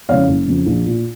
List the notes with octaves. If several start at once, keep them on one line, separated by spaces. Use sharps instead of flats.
F2 C#3 C#5 F5
F#1
F2 C#3
A#1
A#2